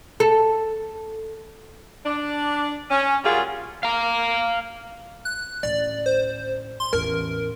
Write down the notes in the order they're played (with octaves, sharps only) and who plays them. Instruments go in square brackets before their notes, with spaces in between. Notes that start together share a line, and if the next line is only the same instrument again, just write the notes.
[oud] A4
[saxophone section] D4
C#4
F#3 G3 A#3 F4 F#4 G#4
[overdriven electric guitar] F5 A#5
[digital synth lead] F#6
[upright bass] A1 D2 [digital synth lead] D5
[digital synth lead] C5
C6
[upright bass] A1 E2 [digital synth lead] A#4